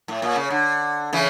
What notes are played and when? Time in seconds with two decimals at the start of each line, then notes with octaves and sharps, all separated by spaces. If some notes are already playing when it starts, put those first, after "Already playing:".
0.08 A2
0.22 A#2
0.36 C#3
0.50 D3
1.13 C#3 E3